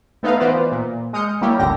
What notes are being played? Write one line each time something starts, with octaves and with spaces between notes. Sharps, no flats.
A3 B3 D#4 B4 D#5 F5
E3 B3 F4 B4 C5 D5
A#2
G#3 D#6 F6 G6 C#7
G3 A#3 E4 G4 A#4 C#5
G1 C#2 D3 G4 A#6